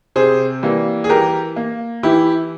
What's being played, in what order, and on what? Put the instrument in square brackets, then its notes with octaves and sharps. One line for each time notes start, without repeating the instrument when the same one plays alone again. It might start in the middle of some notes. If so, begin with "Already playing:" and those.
[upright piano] C3 G#4 C5
E3 G3 A#3
G#4
E3 G4 A#4
A#3
E3 E4 G4